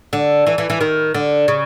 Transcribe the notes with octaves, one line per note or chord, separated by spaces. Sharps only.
D3
E3
E3
E3
D#3
D3
C#3